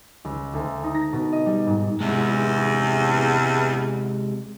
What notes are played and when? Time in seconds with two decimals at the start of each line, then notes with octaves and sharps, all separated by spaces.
0.25 C#2
0.54 D2
0.83 D#4
0.95 A#6
1.13 B2
1.32 D#5
1.46 G3
1.67 G#2
2.01 E2 C3 G#3